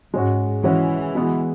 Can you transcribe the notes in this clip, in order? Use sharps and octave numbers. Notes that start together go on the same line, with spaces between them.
G#2 G#3 C#4 F#4
E3 G#3 C#4 F#4
G#3 B3 F#4